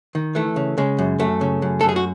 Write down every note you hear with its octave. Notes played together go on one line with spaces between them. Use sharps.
D#3
E3 A3
C#3
C#3 G#3
F#2
F#2 A3
C#3
F#2
F#2 A4
G#4
F#4